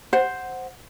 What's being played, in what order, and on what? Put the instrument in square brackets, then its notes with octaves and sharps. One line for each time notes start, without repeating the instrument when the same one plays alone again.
[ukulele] C5 F#5